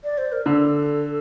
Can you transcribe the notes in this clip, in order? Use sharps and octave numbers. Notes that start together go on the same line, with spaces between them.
D5
C5
A#4
D3 A4